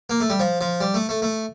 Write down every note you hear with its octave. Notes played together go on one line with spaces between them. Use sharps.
A#3
A3
G3
F3
F3
G3
A3
A3
A3